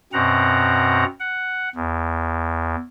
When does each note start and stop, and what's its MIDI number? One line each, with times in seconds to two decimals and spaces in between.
0.13 1.05 42
0.13 1.05 47
0.13 1.05 60
0.13 1.05 78
0.13 1.05 82
1.20 1.69 78
1.75 2.75 40